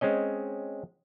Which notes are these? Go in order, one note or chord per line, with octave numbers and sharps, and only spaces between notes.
G#3 C4 C#4 D#5